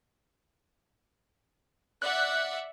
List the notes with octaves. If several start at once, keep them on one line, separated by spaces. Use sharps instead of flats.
D5 E5 F#5 F#6